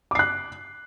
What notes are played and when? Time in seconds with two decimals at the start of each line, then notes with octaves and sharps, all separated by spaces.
0.11 D6
0.15 C7
0.19 F#6